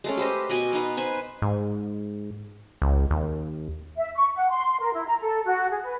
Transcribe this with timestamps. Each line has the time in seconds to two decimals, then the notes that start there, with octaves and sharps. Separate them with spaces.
0.04 G#3 A3 C#4
0.18 G4 B4 C5 D#5
0.49 B2 D#5 G#5 D6
0.73 B3 D#4 B4
0.97 B4 C5 G#5
1.42 G#2
2.82 C#2
3.11 D#2
3.97 E5
4.16 C#6
4.35 F#5
4.50 C6
4.80 A#4
4.93 E4
5.06 A#5
5.21 A4
5.46 F#4
5.71 G#4
5.83 B4